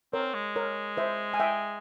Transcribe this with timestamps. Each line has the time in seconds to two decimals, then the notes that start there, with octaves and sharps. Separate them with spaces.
0.13 C4 A#4 C#5
0.34 G#3
0.56 A#4 C#5
0.97 C5 E5
1.34 G#5
1.40 E5 G5